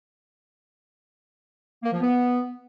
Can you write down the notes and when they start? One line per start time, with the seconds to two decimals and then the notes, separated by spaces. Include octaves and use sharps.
1.83 A#3
1.92 F3
2.01 B3